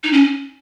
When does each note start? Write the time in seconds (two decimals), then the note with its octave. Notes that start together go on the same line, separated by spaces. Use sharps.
0.04 D#4
0.12 C#4